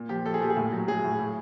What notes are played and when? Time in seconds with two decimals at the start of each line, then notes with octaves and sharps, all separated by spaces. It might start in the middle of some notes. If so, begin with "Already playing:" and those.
Already playing: A#2
0.09 F3 G4
0.25 F3 A4
0.34 G#4
0.41 A#2 G4
0.50 G#4
0.57 A2
0.73 F#3
0.88 F#3 G#4
1.04 A2
1.19 A2